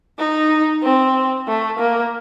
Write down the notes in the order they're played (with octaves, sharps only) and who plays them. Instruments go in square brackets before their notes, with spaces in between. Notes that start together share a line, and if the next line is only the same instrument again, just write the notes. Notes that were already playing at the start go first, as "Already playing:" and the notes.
[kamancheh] D#4
C4
A3
A#3